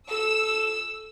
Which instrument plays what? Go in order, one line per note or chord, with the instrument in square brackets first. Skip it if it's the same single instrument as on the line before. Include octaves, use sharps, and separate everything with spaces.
[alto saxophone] A4 [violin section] E6